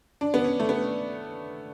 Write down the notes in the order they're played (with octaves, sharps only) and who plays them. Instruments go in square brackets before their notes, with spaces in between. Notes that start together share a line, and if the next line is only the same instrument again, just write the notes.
[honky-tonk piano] D4
B3
C#4
A3
B3